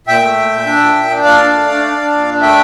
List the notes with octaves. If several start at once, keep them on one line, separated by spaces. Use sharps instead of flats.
A#2 E5 G5
A3
A#2
A#2
D4
A#2
A#2
D4
A#2 D5 F5
D4
A3
D4
D4
D4
A#2
D4
A3 E5 G5